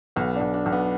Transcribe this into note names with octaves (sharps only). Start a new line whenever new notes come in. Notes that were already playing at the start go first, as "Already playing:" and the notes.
B1 B3
D4
B1
D4
B1
B3